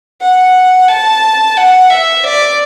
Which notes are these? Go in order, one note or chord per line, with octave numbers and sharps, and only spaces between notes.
F#5
A5
F#5
E5
D5